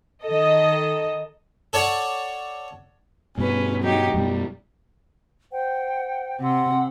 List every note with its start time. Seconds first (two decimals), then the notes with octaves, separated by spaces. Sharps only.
0.24 D#3 A4 D#5
1.73 A4 C#5 D5 F#5
3.38 G2 B2 G3 C#4 B4
3.81 F#3 D#4 G4
4.14 F#2 B2 G3
5.51 C5 F#5 G5
6.41 C3 F#5 C6 E6